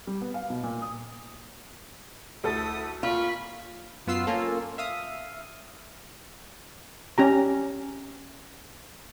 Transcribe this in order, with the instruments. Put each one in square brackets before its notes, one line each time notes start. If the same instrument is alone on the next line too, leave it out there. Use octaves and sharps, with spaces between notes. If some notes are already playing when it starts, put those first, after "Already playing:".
[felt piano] G3
B3
F5
B2
A#2
D#6
[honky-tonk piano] D2 A4 A6 [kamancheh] E4 D#6
[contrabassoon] A#2 [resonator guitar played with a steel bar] F4 [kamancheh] B5 C#6
[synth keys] F#2 B3 F4 E6 C7
A#3 C#4 F4 A4
E5 F5 D#6
[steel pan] C#4 G4 A#5